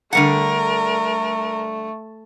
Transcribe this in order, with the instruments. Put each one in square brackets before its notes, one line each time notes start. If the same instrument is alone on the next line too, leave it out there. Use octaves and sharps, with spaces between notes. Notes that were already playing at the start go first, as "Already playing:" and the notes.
[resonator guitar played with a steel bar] D3 G3 F#5 [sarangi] A3 [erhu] A#4